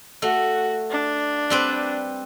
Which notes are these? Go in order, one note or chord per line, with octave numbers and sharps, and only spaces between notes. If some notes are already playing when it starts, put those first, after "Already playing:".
A3 F#4
D4
G3 C4 B4